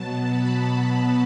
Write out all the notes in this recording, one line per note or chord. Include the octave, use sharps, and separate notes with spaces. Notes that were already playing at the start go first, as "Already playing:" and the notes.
Already playing: B2 F#3 B3 A5
B5
A5